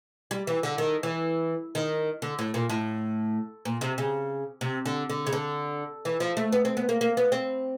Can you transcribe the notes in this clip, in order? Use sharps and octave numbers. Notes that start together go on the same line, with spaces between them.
G3
E3
D3
D#3
E3
D#3
D3
A2
A#2
A2
A#2
C3
C#3
C3
D3
D3
C#3
D3
E3
F3
A3
B3
C4
B3
A#3
A#3
B3
C4